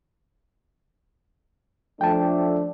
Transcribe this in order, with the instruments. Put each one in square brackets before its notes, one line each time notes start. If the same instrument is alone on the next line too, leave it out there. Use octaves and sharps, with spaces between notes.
[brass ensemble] F3 A3 D4 [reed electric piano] G5 A5